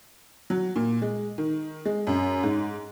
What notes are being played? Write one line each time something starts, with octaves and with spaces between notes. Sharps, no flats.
F#3
A#2
G#3
D#3
G#3
F#2
G#2